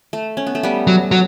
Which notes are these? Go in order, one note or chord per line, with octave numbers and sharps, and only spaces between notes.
A3
C#4
B3
A3
G3 B3
F#3
F#3